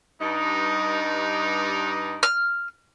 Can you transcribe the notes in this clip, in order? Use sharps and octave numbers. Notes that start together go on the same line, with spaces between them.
G2 D#4
F6